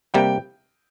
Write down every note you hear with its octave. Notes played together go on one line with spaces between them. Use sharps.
C3 G3 A#3 G5